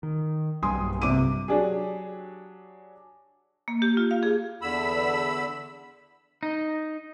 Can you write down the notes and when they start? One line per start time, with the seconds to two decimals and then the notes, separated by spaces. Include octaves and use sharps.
0.03 D#3
0.63 B1 G2 G3 G#5 C6 D#6
1.02 C3 D6 D#7
1.48 F#3 D4 G4 G#4
3.68 A#3
3.82 G4
3.97 F4
4.11 F5
4.23 G#4
4.62 E2 D3 B5 E6
6.43 D#4